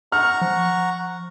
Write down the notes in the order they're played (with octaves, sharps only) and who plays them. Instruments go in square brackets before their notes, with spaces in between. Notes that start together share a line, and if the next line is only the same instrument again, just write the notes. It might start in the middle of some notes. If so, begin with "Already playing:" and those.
[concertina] F#5 A#5 C#6 [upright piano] F6
[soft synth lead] F3